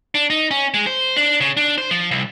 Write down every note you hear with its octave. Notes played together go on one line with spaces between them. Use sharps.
D4
D#4
C#4
G#3
C5
D4
C#3
D4
C5
F3
C2